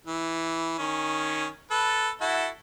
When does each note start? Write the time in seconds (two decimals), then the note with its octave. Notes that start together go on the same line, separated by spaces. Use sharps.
0.07 E3
0.79 D#3 C#4
1.71 A4 B4
2.21 E4 F#4 A4